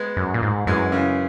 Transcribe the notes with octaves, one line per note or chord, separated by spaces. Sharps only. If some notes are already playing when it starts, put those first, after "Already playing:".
Already playing: G#3 B3
F#2
A#2
G#2
F#2 E3 G#3
C#3 E3